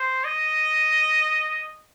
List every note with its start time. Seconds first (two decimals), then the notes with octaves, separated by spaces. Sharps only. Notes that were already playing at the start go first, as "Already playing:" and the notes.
Already playing: C5
0.25 D#5